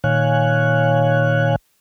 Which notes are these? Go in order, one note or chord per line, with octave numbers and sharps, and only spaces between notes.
A#2 D#3 C#5 F5 G#5 F#6